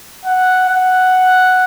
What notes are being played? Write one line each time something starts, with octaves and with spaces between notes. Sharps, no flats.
F#5
F#5